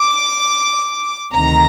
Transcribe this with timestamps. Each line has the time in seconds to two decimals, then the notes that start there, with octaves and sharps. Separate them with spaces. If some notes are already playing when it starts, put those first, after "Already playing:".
Already playing: D6
1.33 D2 C3 D#3 A#5